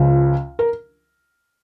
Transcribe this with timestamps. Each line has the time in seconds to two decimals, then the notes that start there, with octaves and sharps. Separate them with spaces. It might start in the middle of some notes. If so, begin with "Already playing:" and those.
Already playing: C#2 C#3 F3
0.59 A#4